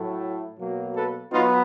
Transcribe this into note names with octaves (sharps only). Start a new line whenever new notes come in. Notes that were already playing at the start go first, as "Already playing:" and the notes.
Already playing: A2 F#3 A3
B2 F#3 A#3
A4 B4
F#3 B3 D#4 F4